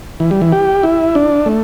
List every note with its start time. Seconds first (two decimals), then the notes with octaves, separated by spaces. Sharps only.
0.20 E3
0.31 G3
0.41 E3
0.52 G4
0.83 E4
1.15 D4
1.46 A3